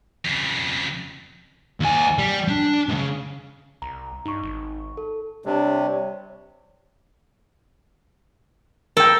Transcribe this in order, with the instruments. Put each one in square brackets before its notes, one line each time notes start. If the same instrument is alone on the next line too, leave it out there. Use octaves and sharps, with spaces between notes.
[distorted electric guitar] F2 C#3
D#2 G#5
G3
D4
C#2 C#3
[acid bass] C2 [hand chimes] A#5
[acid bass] G2 [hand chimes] D#4 C#6
[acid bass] G#1
[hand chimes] A4
[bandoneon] C3 [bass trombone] G3 [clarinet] D4 [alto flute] C#5
[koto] A4 [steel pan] A#4 G5